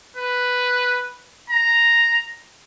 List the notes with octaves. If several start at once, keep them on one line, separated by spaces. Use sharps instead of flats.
B4
A#5